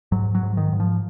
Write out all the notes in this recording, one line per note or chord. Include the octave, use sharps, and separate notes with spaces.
G#2 F#3
F#3
G#2
D#3
G#2
F3